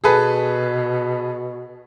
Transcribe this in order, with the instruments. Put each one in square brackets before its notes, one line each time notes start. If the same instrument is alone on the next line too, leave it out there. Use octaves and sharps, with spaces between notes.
[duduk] B2 [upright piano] G#4 A4 B4